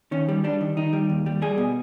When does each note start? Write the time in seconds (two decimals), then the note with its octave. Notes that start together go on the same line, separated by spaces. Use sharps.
0.11 D#3 C#4
0.29 G3
0.44 G3 D4
0.61 D#3
0.77 D#3 D#4
0.93 G3
1.09 D#2
1.26 G3
1.42 G3 G#4
1.58 B2